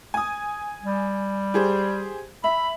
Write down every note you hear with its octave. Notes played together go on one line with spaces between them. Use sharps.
G#5 D#6
G3
G4 G#4 C5
E5 B5